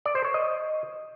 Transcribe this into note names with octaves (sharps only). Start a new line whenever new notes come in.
D5
C5
C#5
D#5